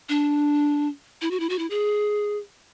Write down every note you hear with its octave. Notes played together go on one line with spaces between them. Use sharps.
D4
E4
F#4
E4
F#4
E4
G#4